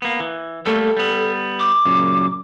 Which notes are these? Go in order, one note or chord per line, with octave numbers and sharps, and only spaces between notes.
A#3 B3
E3
G3 A3 A#3 A4
G3 B3
D6
F#2 A#2 C#3